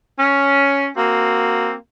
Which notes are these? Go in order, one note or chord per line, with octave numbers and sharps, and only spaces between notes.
C#4
A#3 C4 F#4